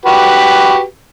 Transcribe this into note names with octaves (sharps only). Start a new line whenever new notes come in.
F#4 G4 B4